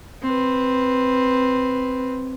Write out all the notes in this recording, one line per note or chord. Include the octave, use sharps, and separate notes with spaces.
C4 B4